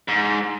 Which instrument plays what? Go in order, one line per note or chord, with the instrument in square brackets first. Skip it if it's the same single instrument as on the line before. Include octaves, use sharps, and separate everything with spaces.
[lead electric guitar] G#2